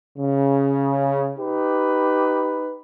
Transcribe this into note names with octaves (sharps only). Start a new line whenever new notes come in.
C#3
D#4 G4 B4